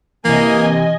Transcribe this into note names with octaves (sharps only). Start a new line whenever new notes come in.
C3 E3 A#3 D#5 G#5